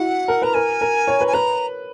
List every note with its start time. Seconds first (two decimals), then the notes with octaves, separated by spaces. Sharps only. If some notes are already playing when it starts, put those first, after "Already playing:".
Already playing: E4 F#4 F#5
0.28 A#4
0.42 B4 A#5
0.54 A#4 G#5
0.81 A#4
1.08 C#5
1.21 B4
1.28 G#5
1.34 B4 A#5